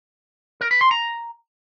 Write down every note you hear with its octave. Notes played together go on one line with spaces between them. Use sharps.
A#4
B4
C6
A#5